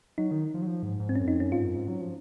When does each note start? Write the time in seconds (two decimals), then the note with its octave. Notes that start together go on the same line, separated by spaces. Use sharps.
0.18 F#3 D#4
0.31 D#3
0.54 F3
0.62 F#3
0.67 F3
0.83 G#2
1.00 G#2
1.09 C4
1.15 C#4
1.20 F#2
1.28 F2 D#4
1.40 F#2 C#4
1.52 G#2 F4
1.64 F#2
1.76 G#2
1.88 F#3
2.01 F3